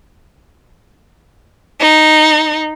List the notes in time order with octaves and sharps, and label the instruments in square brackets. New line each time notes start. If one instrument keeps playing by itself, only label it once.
[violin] D#4